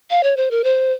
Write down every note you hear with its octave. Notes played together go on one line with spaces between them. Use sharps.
F5
C#5
C5
A#4
C5